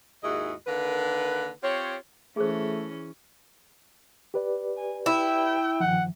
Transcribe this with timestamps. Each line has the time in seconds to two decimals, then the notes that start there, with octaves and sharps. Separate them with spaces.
0.24 D#2 G#2 E4 F#4 G#4 D#5
0.66 D3 D#3 A#3 B4
1.63 C4 F4 G4 C#5
2.37 E3 A3 C#4 G#4 A#4 C5
4.34 G4 B4 D5
4.77 G#5
5.06 E4 G5
5.80 G2 D#3 F3 F#5